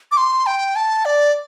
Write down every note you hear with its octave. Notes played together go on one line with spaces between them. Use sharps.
D6
C6
G5
A5
D5